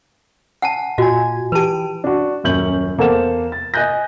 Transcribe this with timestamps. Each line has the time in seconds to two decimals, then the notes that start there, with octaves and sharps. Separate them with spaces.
0.62 F#5 G#5 A5
0.98 A#2 F4 F#4 D#5 G#5
1.52 E3 G4 B4 A5
2.04 D4 F#4
2.44 D#1 F#2 C#4 G6 F#7
2.98 E2 A#3 A4 C5 F#5 E7
3.52 A6
3.74 D#5 G#5 F#6 G6 A#6